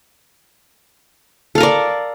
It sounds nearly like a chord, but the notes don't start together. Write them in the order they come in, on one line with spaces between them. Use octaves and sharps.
A4 F5 A#4 D5